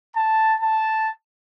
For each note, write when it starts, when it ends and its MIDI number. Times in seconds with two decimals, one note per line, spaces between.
0.14 0.54 81
0.61 1.10 81